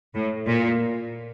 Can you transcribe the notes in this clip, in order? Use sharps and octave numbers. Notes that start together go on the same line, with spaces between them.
A2
A#2